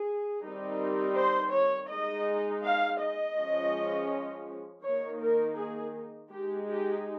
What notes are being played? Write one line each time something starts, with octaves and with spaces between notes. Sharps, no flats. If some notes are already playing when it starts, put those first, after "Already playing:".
Already playing: G#4
D#3 G3 C4 D#4
C5
C#5
G#3 D#4 D#5
F5
D#5
F3 G#3 C#4
D#3 A#3 D#4 C#5
A#4
G#4
G#3 D#4 G4
G4